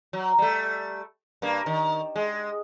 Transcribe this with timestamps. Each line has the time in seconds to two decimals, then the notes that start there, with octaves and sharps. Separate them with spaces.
0.13 F#3
0.38 G3 A3
1.42 G2 A#3
1.66 D#3
2.16 G#3